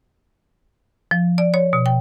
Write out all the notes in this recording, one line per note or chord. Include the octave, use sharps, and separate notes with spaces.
F3
D5
C#5
B2
G5